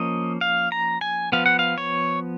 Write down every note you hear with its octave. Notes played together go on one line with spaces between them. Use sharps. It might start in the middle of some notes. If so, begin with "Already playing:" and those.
Already playing: F3 A#3 C#4 D#5
F5
A#5
G#5
F3 B3 F5
F#5
F5
C#5